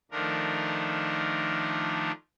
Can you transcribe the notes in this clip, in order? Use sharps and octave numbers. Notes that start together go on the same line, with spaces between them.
D#3 F3 A3 D4 A#4